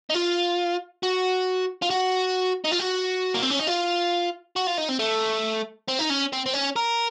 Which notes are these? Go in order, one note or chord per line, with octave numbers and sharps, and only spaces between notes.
D#4
F4
F#4
F4
F#4
D#4
F4
F#4
A#3
C4
C#4
D#4
F4
F#4
F4
D#4
C4
A3
C4
D#4
C#4
C4
C4
C#4
A#4